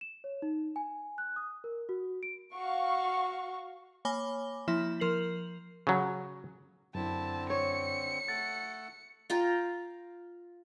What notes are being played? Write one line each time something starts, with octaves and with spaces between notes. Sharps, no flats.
E7
C#5
D#4
G#5
F#6
D#6
A#4
F#4
D7
F#4 F5 C#6
A#3 C#5 G#5 B5 D6 G7
F3 A#3 E4 E5
F3 A#4 C7 F#7
C#3 F#3
F#2 D3 C4 E4 A5
C#5 C#7
A3 A4 F#5 A6
F4 G5 A#5